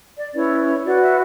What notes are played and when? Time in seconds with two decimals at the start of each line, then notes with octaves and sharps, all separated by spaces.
0.18 D5
0.34 C#4 E4 B4 C#5
0.60 C#5
0.85 F#4 B4 D5
1.02 E5